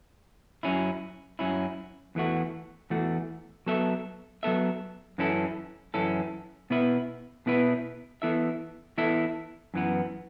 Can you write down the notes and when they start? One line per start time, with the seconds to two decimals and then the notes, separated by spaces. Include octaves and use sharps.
0.63 F#2 F#3 C#4 E4
1.39 F#2 F#3 C#4 E4
2.15 E2 E3 A3 F#4
2.90 E2 E3 A3 F#4
3.66 F#3 B3 A4 E5
4.43 F#3 B3 A4 E5
5.18 F#2 E3 C#4 E4 A4
5.94 F#2 E3 C#4 E4 A4
6.70 B2 B3 E4 B4 E5
7.46 B2 B3 E4 B4 E5
8.22 E3 B3 E4 A4 E5
8.98 E3 B3 E4 A4 E5
9.74 F#2 E3 B3